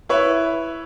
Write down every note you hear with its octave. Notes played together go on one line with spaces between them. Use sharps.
E4 B4 C#5 E5